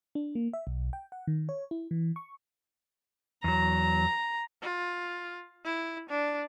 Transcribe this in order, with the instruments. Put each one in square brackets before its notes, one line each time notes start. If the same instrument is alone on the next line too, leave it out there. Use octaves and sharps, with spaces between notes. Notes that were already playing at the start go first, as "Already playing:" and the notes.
[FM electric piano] D4
A#3
E5
B1
G5
F#5
D#3
C#5
E4
E3
C#6
[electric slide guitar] E2 F#3 [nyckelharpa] A#5
[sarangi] F4
E4
D4